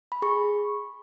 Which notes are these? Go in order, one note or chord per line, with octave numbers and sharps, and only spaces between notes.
B5
G#4 C#6